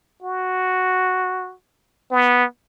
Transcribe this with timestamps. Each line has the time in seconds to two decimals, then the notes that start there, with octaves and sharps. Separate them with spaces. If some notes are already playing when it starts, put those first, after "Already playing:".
0.22 F#4
2.11 B3